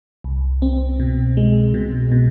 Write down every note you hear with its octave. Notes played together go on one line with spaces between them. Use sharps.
C2
C4
B2
G#3
B2
B2